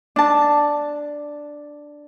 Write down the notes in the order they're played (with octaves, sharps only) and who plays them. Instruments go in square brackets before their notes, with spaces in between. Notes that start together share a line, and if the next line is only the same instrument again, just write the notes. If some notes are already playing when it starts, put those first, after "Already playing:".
[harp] D4 A5